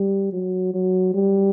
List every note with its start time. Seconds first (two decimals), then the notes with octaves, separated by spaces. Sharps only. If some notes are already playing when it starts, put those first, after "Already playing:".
Already playing: G3
0.33 F#3
0.74 F#3
1.14 G3